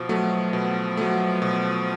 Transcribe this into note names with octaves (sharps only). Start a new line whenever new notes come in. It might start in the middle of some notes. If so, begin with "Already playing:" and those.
Already playing: B2 F3
F#3 A3
B2
F#3 A3
B2